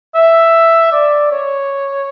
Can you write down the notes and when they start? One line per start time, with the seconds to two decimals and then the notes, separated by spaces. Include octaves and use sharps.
0.15 E5
0.92 D5
1.32 C#5